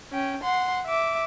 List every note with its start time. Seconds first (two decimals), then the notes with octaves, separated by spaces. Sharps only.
0.12 C#4 G5
0.43 F#5 C6
0.86 E5 D6